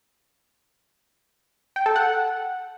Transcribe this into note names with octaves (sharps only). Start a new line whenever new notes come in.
G5
A4
F#5